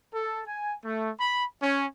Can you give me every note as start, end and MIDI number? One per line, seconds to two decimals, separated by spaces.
0.13 0.42 69
0.47 0.73 80
0.84 1.09 57
1.19 1.45 83
1.61 1.86 61